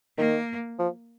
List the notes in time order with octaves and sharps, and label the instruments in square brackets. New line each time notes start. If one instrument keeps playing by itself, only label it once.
[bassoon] D#3 [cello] A#3
[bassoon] F3